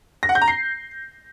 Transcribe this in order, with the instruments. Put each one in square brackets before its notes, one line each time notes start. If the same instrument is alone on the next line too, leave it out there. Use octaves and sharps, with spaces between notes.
[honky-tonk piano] A#6
F#5
G6
A#5
C7